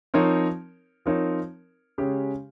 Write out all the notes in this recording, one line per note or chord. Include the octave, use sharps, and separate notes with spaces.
F3 C4 D#4 A#4 C#5
F3 C4 D#4 A#4 C#5
C#3 G#3 C#4 G4